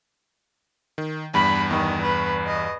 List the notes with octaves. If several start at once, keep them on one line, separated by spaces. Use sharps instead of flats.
D#3
E2 G2 B5
E2 G2 D#3
B4
D#5